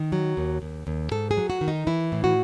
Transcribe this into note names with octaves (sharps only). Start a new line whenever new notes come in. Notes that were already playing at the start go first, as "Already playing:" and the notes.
Already playing: D#3
F#3
D#2
D#2
D#2
G#2 A4
G#4
F#3
F#4
D#3
D#4
E3 E4
A2
F#4